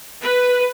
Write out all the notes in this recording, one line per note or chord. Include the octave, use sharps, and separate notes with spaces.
B4